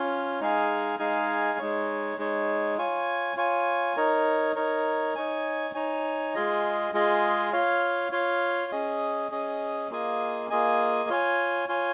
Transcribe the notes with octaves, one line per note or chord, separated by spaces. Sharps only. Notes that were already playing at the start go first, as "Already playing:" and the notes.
Already playing: C#4 F4 C#5
G#3 D#4 G#4 F5 G#5
G#3 D#4 G#4 F5 G#5
G#3 D#4 C#5
G#3 D#4 C#5
F4 C#5 G#5
F4 C#5 G#5
D#4 A#4 C#5
D#4 A#4 C#5
D#4 C#5 G#5
D#4 C#5 G#5
G#3 F4 G#4 D#5
G#3 F4 G#4 D#5
F4 C#5 F5
F4 C#5 F5
C#4 G#4 D#5
C#4 G#4 D#5
A#3 F4 G#4 D#5 G#5
A#3 F4 G#4 D#5 G#5
F4 C#5 G#5
F4 C#5 G#5